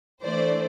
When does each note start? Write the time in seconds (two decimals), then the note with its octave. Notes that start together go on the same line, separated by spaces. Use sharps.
0.24 E3 A3 D4 C5 D5